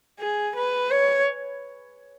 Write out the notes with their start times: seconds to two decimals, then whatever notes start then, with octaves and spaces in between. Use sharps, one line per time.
0.20 G#4
0.55 B4
0.91 C#5